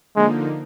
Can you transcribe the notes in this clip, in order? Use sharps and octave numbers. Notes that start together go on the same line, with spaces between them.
D3 F3 G#3 A#3 D#4